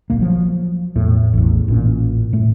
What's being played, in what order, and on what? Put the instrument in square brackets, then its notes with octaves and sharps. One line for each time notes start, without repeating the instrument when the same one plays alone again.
[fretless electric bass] D1 A#1 A#3
F3 F#3
E2 A2
A1 E2
A1 A#2 C#4
A2 A3